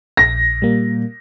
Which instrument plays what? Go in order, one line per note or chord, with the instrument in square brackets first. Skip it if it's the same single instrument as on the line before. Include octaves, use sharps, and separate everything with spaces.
[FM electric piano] A#1 [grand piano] A#6
[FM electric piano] A#2 G3 A#3